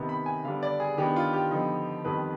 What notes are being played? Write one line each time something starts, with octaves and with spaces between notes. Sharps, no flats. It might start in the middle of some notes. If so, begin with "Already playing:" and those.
Already playing: C3 D#3 B3
B5
G#5
D3 G3 B3 D4 F5
D5
G#4
D#3 B3 D4 G4
F4
G4
D3 F3 B3 D#4
F2 D#3 G3 B3 B4